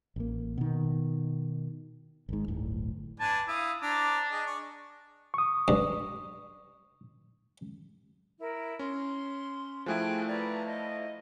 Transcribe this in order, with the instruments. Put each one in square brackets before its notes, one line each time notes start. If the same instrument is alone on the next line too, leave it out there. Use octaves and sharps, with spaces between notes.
[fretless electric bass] A1 A#3
B2 D#3
G#1 G#2
D1 G1 A2
[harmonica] D4 B4 G#5 [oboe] A5
[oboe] E4 [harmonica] F5 D#6
[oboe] D4 [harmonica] C5 A#5 D6
[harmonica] G#4 D#5
D5 C#6
[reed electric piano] C#6 D#6
[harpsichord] G2
[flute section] E4 A#4
[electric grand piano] C#4 [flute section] C6
[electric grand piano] F3 A3 E4 [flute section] G#4 G5 F#6
[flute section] B4 D5 A#5
D#5